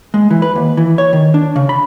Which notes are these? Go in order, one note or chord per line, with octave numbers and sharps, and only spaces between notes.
G#3
E3
B4
D#2
E3
C#5
D#3
D4
C#3
B5